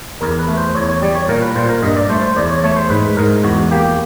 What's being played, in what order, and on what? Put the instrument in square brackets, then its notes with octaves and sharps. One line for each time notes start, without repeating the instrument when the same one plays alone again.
[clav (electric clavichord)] E2 A#4
B4
A3
C5
E2 C#5
C#5
G3 D5
C#5
A#2 A#4
B4
A#2 C5
A#4
G2 D#5
D5
A3 C5
C5
E2 D5
C#5
A3 C#5
C5
G#2 B4
G#2 A#4
E2 F#4
A#3 G4